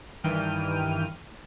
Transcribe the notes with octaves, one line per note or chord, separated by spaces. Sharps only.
G2 D#3 E3 G5 F6 D#7